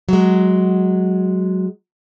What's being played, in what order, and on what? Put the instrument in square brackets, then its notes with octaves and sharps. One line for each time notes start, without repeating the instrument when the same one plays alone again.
[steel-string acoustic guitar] F#3 G#3